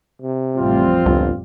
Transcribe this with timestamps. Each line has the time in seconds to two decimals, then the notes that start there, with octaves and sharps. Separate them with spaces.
0.22 C3
0.57 A1 F2 G3 C4 F4
1.06 G1 C#2